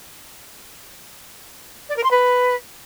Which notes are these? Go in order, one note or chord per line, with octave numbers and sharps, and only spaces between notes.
D5
A#4
C6
B4